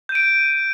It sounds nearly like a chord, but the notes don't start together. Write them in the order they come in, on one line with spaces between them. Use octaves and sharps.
G6 D#7 D7